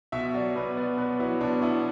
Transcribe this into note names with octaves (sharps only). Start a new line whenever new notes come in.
B2 E5
F#3 D5
B2 B4
B3 D5
B2 B4
F#3 E4
B2 D4
B3 E4